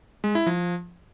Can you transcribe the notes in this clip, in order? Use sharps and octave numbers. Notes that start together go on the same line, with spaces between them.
G#3
E4
F3